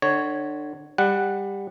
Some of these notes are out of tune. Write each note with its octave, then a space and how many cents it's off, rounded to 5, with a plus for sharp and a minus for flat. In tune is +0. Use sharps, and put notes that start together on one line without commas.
D3 +30 C#5 +0
G3 +15 F#5 +0